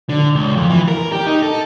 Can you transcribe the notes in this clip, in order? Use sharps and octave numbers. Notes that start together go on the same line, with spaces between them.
D3
C#2
F2
E3
A#4
G4
D#4
A4